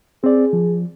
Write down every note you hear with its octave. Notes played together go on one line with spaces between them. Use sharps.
C4 G#4 D5
F3